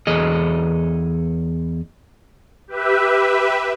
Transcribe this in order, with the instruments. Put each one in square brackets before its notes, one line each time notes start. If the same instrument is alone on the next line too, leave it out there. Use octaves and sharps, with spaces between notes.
[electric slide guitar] E2 G#4 A4 D#5
[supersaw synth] G4 B4 E5